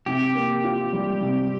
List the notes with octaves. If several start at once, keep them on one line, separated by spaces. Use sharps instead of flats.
C3 G4
A#3
F4
G3
C3